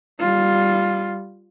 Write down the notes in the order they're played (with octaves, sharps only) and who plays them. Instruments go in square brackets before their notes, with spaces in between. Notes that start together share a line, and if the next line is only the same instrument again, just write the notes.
[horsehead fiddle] G3 F4